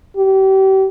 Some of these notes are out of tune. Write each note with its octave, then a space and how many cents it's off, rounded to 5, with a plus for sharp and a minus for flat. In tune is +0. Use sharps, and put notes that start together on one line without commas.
G4 -35